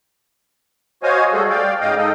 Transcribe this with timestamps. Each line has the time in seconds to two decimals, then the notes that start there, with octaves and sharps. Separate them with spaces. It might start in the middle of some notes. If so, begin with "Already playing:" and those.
1.03 F#4 C5 C#5 D#5 F5 G#5
1.33 G3 A3 F#4 G#4 A4
1.50 D5 F5 G5
1.81 G#2 C#3 D#5 F5 G5
1.97 D#4 A4 D#5